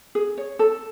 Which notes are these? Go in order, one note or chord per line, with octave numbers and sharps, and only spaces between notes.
G#4
C#5
A4